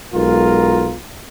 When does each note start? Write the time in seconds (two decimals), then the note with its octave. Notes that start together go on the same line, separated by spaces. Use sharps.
0.15 B1 G#3 F4 A#4